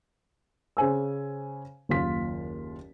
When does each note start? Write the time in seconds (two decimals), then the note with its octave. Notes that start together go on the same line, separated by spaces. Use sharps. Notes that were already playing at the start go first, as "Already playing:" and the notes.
0.77 C#3 C5 G#5 E6
1.89 F#1 D#2 F4 B6